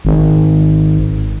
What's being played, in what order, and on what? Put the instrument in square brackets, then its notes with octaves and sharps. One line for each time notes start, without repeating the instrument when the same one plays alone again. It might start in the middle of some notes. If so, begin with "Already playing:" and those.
[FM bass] G#1